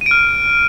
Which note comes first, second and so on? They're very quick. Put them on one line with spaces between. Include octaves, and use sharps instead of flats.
D#7 D7 F6